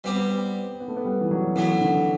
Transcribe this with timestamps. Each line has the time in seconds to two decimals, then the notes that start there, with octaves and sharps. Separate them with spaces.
0.04 G3 B3 C4 G4
0.30 B3
0.80 B3
0.88 A3
0.97 B3
1.05 G3
1.21 E3
1.31 F#3
1.56 A2 E3 F#3 B3
1.81 D3